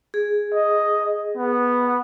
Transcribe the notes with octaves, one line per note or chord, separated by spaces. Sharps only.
G#4
D#5
B3